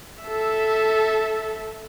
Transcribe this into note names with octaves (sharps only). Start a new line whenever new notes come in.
A4 E5